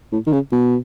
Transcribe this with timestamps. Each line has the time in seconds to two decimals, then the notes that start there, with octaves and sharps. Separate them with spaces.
0.12 A2
0.27 D#3
0.33 C#3
0.52 B2